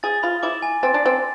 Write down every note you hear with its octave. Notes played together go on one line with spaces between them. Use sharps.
G#4 A6
F4 B5
E4 D6
G#5
C4 A6
D4
C4 B5